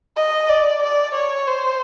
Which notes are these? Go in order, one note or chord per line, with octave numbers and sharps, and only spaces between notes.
D#5
D5
D5
C#5
C5